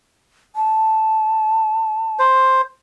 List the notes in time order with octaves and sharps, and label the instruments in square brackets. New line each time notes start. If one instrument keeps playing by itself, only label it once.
[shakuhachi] A5
[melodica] C5